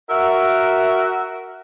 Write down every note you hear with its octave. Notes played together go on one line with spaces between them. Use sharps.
F#4 A#4 E5